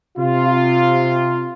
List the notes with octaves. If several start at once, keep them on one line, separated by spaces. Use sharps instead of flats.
C3 F4